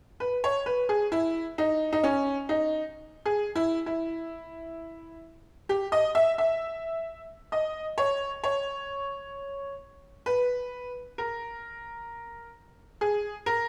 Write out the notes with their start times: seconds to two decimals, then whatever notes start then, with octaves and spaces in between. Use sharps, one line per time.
0.20 B4
0.44 C#5
0.66 B4
0.89 G#4
1.12 E4
1.58 D#4
1.93 D#4
2.03 C#4
2.49 D#4
3.26 G#4
3.55 E4
3.86 E4
5.69 G4
5.92 D#5
6.15 E5
6.38 E5
7.52 D#5
7.98 C#5
8.44 C#5
10.26 B4
11.18 A#4
13.01 G#4
13.46 A#4